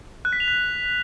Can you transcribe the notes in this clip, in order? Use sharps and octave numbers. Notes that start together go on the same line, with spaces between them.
F#6
B6
F7
B6